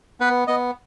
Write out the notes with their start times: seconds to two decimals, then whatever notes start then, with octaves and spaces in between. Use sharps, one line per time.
0.20 B3 B4
0.47 B3 D#5